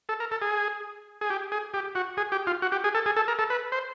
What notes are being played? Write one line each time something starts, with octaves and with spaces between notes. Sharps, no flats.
A4
A#4
A4
G#4
G#4
G4
G#4
G4
F#4
G#4
G4
F4
F#4
G4
G#4
A4
G#4
A4
A#4
A4
B4
C5